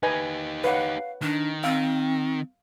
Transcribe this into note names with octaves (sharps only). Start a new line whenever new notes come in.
D#4 G4 B4 D#5 G#5
B4 C#5 F5 F#5
D#3 D4
C4 F5